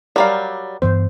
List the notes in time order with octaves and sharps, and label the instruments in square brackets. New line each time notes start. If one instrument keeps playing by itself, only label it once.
[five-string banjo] F#3 G3 F5 [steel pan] G4 A#4 D5
[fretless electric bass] G2 E3 B3 [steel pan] C5